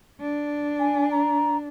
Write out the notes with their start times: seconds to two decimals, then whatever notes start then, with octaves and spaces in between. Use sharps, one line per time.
0.21 D4
0.80 G#5
1.11 A#5